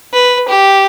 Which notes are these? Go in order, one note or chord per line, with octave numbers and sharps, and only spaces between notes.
B4
G4